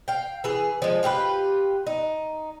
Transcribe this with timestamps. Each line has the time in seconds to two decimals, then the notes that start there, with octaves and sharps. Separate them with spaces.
0.08 F5 G5
0.44 E3 G#4
0.82 F3 G#3
1.03 F4 G4 G#4 B4
1.87 D#4